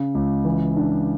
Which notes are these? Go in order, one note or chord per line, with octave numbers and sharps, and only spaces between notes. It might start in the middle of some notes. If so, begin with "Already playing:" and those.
Already playing: C#3
C#2
E3
D4